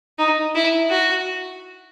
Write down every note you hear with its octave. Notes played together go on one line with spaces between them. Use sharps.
D#4
E4
F#4